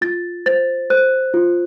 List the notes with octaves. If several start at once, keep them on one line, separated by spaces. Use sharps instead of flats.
F4 A6
C5 A6
C5 F#6
F4